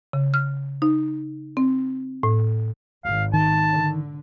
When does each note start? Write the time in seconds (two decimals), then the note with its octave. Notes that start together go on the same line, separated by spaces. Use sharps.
0.13 C#3
0.34 F6
0.82 D#4
1.57 C4
2.23 A2
3.05 G#1 F5
3.34 D#3 A5
3.68 D3